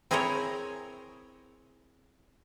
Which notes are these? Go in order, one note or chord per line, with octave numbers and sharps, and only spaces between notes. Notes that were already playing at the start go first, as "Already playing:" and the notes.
C4 E4 G#4 A#4 C5 C#5